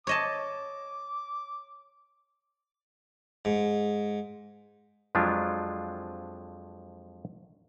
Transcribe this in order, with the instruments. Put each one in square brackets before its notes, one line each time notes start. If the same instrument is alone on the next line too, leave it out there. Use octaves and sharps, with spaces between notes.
[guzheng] C#5 D#5 A5 [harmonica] D6
[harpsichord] G#2
[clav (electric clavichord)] F2 F3 F#3 G#3 D4 F4